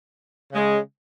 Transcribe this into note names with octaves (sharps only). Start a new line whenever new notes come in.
C#3 G#3